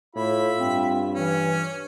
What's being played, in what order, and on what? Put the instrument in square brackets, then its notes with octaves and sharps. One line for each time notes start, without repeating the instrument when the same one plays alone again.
[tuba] A2 [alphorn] F4 [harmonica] E5 B5
[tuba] G2 [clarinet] C4
[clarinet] E3 [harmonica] C#4